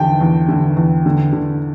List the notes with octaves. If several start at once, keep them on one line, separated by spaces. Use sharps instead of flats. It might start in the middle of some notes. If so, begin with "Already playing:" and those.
Already playing: E2 D3 G5 A5
E2
D3
E2
D3
D3